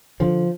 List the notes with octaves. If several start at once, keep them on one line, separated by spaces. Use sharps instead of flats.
D3 F3